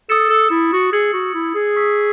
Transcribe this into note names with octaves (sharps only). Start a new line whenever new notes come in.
A4 D#6 A6 C#7 E7
A4
E4
F#4
G#4 E6 G#6 C#7 F#7
F#4
E4
G#4
C#6 E6 B6